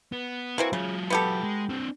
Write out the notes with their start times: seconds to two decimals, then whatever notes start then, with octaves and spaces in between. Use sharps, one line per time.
0.12 B3
0.58 E3 A#3 C4 F#4
0.73 C#3 F#3 F4
1.10 B3 G4 A4
1.43 G#3
1.70 C4 D4